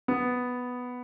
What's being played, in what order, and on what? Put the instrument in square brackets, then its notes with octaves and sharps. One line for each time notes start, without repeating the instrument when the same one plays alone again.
[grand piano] B3